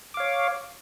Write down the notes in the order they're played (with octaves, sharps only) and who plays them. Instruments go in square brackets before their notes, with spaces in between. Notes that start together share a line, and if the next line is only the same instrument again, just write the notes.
[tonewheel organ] D6
F5
C#5